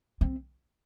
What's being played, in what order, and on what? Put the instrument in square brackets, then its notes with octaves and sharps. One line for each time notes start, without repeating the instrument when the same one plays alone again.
[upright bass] C4